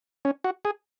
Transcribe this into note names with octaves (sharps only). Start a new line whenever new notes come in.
C#4
F#4
G#4